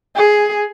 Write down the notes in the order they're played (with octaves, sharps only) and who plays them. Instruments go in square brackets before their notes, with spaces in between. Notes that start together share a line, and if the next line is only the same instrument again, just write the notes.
[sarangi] G#4